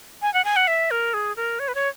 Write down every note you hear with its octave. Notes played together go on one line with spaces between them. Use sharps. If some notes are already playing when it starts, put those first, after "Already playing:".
G#5
F#5
G#5
F#5
E5
A#4
G#4
A#4
C#5
B4
C#5